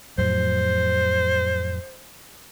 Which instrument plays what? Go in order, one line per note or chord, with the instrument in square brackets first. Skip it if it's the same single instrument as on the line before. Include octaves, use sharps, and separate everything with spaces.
[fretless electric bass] F2 A2 F#3 [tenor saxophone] C5